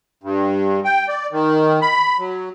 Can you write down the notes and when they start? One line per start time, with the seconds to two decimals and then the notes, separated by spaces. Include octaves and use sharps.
0.24 G2
0.85 G5
1.08 D5
1.32 D#3
1.82 B5
2.19 F#3